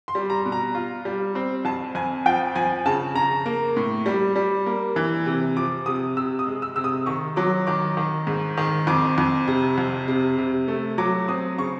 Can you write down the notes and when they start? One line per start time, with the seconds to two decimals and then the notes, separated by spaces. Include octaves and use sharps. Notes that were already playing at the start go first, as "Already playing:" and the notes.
0.08 C6
0.15 G3
0.30 A#5
0.45 B2
0.52 A#5
0.75 F4
1.05 G3
1.35 C4
1.65 F2 A5
1.95 F2 G#5
2.26 F3 G5
2.55 F3 G#5
2.85 C#3 A5
3.15 C#3 A#5
3.46 A#3
3.77 A2
4.06 G3
4.36 G3
4.66 A#3
4.96 E3
5.26 C3
5.56 F3 D6
5.86 C3 D#6
6.17 C3 E6
6.39 D#6
6.46 G#3
6.62 E6
6.76 C3 E6
6.84 D#6
7.06 D#3 C#6
7.36 F#3 D6
7.67 D#3 D6
7.97 D#3
8.27 G#2
8.58 D#3
8.87 F2 D6
9.18 F2
9.48 C3
9.78 F2
10.08 C3
10.38 C3
10.68 A3
10.98 F#3 D6
11.28 C4 D#6
11.58 C#3 C#6